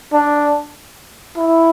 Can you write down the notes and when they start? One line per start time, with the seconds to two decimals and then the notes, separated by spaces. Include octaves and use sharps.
0.13 D4
1.37 E4